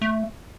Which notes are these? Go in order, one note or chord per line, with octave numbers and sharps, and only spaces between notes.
A3